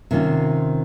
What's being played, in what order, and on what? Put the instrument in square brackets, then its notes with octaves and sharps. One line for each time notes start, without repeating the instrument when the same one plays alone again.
[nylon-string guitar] C3 D#3 A#3 C#4 F4